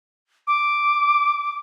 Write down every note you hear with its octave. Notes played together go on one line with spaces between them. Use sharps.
D6